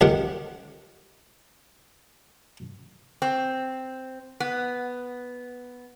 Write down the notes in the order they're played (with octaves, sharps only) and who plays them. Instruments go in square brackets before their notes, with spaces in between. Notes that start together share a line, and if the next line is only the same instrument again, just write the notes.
[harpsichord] C#2 D#3 G4 F#5
[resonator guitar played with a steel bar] C4
B3